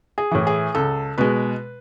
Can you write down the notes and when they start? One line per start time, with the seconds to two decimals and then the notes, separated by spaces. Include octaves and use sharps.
0.18 G#4
0.31 A2 E3
0.47 G#4
0.75 C#2 A4
1.18 B2 G#3 B4